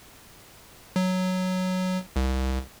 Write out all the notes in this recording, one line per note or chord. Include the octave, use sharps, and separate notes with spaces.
F#3
C2